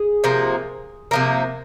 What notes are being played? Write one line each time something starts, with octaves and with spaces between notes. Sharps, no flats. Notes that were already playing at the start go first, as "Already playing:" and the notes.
Already playing: G#4
C3 F3 A#3
C3 F3 A#3